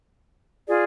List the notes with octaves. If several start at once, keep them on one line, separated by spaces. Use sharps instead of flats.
F4 G#4 D5